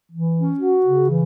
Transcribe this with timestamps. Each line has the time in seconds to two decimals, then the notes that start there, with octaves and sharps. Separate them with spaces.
0.11 E3
0.35 C#4
0.60 F#4
0.85 C#3
1.09 E3